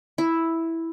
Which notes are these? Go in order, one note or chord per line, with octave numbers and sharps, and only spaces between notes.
E4